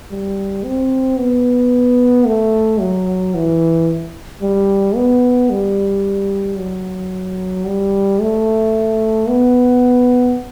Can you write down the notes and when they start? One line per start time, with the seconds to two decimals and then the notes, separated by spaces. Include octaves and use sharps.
0.11 G3
0.64 C4
1.18 B3
2.27 A3
2.80 F#3
3.35 E3
4.42 G3
4.96 B3
5.50 G3
6.58 F#3
7.67 G3
8.21 A3
9.29 B3